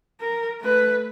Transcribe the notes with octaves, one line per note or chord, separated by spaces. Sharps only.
A#4
A3 B4